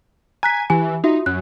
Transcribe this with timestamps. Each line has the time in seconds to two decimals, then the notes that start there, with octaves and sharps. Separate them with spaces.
0.43 G#5 A#5 F#6 B6
0.70 E3 G4 G#5
1.04 D#4 F4 F#4 E5
1.26 F#2 F#6